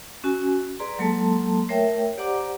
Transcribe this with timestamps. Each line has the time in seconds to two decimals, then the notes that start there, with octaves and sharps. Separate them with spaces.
0.24 C#4 F#4 G#5
0.80 G#4 B4 D5 A#5 C6
0.99 F#3 G#3 A#3 A4 A5 C6
1.69 A3 A#4 C#5 E5 G5
2.17 G4 C5 D5 F#5 A#5 D6